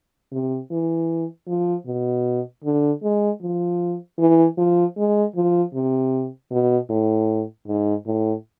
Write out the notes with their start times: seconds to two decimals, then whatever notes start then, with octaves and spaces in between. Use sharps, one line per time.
0.32 C3
0.71 E3
1.48 F3
1.86 B2
2.64 D3
3.03 G#3
3.42 F3
4.18 E3
4.58 F3
4.97 G#3
5.36 F3
5.74 C3
6.51 B2
6.90 A2
7.67 G#2
8.06 A2